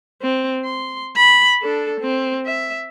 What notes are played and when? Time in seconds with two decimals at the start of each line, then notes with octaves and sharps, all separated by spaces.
0.22 C4
0.65 C6
1.17 B5
1.62 D4 A4
2.00 C4
2.46 E5